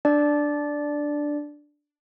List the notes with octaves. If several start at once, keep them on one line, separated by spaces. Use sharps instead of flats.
D4 D5